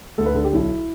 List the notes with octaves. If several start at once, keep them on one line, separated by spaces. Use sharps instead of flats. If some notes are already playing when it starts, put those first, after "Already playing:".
D2 A4
B4
D3 A4
G4
B1 E4